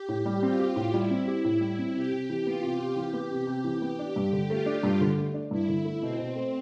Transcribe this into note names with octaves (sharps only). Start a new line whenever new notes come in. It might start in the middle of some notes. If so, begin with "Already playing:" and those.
Already playing: G4
A2
G3
C4 F4
G4
A2
G3 E4
C4
G4
A2
G3
C4
C3 G4
C3
E3
B3 F4
C3
C3
E3 G4
B3
C3
C3 G4
E3
B3
D4
G2
D3
A3 F4
D4
G2
D3
A3
D4
G2 E4
D3
A3
B2 C4
B2
A3